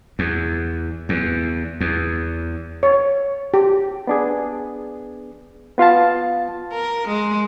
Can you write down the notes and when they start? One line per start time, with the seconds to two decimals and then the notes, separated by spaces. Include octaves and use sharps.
0.19 E2
1.09 E2
1.81 E2
2.83 C#5
3.54 G4
4.07 B3 D4 G#4
5.78 B3 F4 F5 A5
6.73 A#4
7.08 G#3